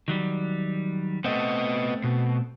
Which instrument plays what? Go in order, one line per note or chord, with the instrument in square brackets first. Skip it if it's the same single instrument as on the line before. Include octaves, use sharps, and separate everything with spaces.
[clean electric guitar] D#3 F#3 G3
[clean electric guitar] A3 C4 [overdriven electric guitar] B3 D#5
[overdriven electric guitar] B2